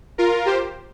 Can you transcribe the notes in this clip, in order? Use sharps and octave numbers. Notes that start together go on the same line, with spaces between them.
F4 A#4
G4 C5